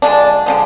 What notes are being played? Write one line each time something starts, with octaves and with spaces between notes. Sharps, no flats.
D3 F3 G#3 D4
D3 F3 G#3